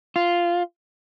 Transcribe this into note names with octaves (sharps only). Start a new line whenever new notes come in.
F4